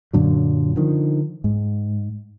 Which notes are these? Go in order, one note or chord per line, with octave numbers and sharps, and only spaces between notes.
F#2 A#2 D3 F#3
D3 D#3 F3
G#2